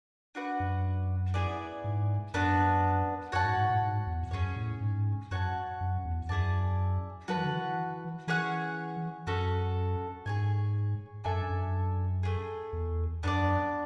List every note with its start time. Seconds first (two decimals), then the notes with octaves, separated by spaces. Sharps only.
0.35 D4 F#4 B4 F#5
0.60 F#2
1.34 B3 E4 G#4 D5
1.84 G#2
2.34 F#2 B3 D4 F#4 B4
3.32 F#2 F#4 C#5 F#5 A5
3.45 G#2
3.57 G#2
3.70 A2
3.82 G#2
4.07 E2
4.31 F#2 C#4 G#4 C#5
4.56 A2
4.81 G#2
5.31 F#2 F#4 C#5 F#5 A5
5.80 F#2
6.05 E2
6.29 F#2 E4 G#4 D5 A5
7.28 F#3 F#4 B4 F#5 A5
7.37 E3
7.45 D3
7.52 E3
8.27 E3 C#4 G#4 C#5 F#5
9.27 F#2 C#4 F#4 A4
10.26 G#2 G#4 C#5 G#5
11.24 F#2 D4 A4 E5 G#5
11.50 F#2
12.23 A3 D4 G#4
12.73 E2
13.23 F#2 B3 D4 A4 D5